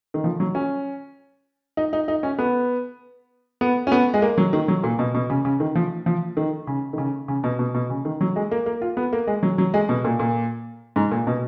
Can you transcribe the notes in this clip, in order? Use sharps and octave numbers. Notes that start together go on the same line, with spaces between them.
D#3
F3
F#3
C#4
D#4
D#4
D#4
C#4
B3
B3
C#4
B3
G#3
A#3
F#3
D#3
F#3
A#2
B2
B2
C#3
C#3
D#3
F3
F3
D#3
C#3
D#3
C#3
C#3
B2
B2
B2
C#3
D#3
F#3
G#3
A#3
A#3
F4
B3
A#3
G#3
F#3
F#3
G#3
B2
A#2
A#2
G#2
A#2
B2